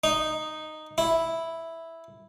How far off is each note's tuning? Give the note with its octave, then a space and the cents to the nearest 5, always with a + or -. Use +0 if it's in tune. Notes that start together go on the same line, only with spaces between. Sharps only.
D#4 -5
E4 -5